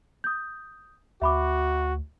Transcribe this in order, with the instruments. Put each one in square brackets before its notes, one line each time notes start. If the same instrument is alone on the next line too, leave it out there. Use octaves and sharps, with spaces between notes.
[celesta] D#6 G6
[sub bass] D2 [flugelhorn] F#4 [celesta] E5 B5 D6